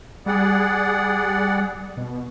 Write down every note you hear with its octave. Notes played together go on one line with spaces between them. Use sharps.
G3 G#4 D5 F#5
B2